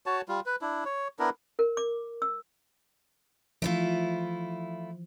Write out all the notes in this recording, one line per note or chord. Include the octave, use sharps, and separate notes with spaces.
F#4 C#5 A5
G3 F4
B4
D4 E4
C#5
B3 D4 E4 A#4
A#4
D6
E6
E3 F3 A3 E4 F4